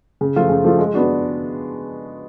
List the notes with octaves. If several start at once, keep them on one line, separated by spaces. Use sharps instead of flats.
C#3
F3 A3 F4
C#3
F3 A3 F4
G#3
B3 D4 F#4